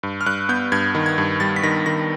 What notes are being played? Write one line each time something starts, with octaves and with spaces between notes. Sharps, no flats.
G2
F6
G2 F#6
B3 G6
G2 G#6
D#3
G#6
G2
G3 A6
B6
D#3 A#6
D#3 A#6